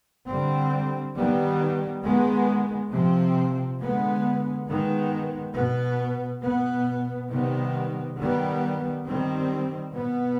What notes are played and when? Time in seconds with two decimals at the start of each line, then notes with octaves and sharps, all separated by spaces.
0.28 D3 G3 C4
1.15 D#3 G3 B3
2.03 D#3 G#3 B3
2.90 C3 F3 C4
3.79 D3 G#3 B3
4.67 D#3 G#3 B3
5.55 B2 B3
6.42 B2 B3
7.31 C3 D#3 G3 B3
8.18 D#3 G3 B3
9.06 D#3 G3 C4
9.93 B2 B3